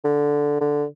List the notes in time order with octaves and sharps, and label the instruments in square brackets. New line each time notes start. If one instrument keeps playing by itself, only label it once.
[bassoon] D3
D3